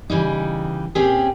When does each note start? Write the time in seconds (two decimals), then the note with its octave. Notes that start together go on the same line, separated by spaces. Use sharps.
0.10 C#3 E3 G3 D#4
0.95 A#2 C4 C#4 G4 G#4